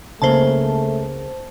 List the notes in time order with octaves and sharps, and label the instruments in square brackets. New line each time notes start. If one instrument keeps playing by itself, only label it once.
[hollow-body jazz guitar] C#2 C#3 A#3 [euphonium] A3 [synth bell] C5 A5